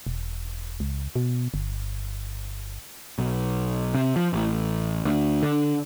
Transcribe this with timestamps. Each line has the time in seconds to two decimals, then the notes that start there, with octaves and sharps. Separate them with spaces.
0.07 E1
0.80 C#2
1.16 B2
1.54 G1
3.18 B1
3.94 C3
4.16 F3
4.33 A1
5.05 D2
5.43 D3